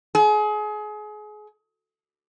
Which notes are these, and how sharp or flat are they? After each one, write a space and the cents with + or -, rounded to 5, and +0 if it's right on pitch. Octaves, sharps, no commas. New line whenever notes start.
G#4 +30